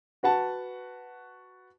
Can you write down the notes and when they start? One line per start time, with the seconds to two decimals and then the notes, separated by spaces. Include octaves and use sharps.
0.23 F#4 B4 F#5 A5